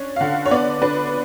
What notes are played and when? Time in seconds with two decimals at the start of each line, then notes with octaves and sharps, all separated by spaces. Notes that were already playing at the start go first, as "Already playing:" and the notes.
Already playing: C#4 D4
0.16 F5
0.21 D3 F#5
0.46 C#5
0.51 B3 D5
0.82 D4 B4